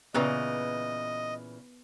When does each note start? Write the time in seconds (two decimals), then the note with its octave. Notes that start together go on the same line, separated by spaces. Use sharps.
0.14 A#2 C#3 E3 B3 B4 D#5